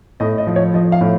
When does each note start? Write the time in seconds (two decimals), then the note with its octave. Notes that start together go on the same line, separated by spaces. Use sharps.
0.20 A2 D#5
0.38 D#5
0.47 F3
0.56 C#5
0.74 F3 D#5
0.92 F5
1.01 A2